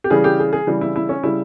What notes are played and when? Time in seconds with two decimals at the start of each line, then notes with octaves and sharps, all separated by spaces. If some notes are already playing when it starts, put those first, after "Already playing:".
0.04 G4
0.10 C#3 E3 G3 G#4
0.24 G4
0.39 G#4
0.53 G#4
0.67 C#3 E3 G3
0.81 E4
0.96 E4
1.09 C#4
1.23 C#3 G3 E4